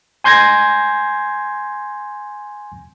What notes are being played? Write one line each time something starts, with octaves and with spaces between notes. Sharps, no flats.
G#5 C6 G6 G#6 A#6